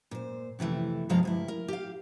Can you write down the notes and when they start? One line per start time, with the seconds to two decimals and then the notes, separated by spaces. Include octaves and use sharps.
0.11 A#2 C5
0.59 F2 C3 E3 A3
1.09 G2 C3 F3 G#3 F5 A#5
1.23 D2 G2 E4
1.48 A#4
1.68 G4 F5